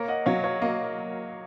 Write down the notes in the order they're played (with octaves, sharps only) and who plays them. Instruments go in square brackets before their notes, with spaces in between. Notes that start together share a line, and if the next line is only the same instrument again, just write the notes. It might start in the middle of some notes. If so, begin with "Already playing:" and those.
Already playing: [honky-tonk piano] A#3 [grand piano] A#4 C#5
[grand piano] D#5 F#5
[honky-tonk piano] F#3 [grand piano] C#5 F5
[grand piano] C#5 F5
[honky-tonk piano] A#3 [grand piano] D#5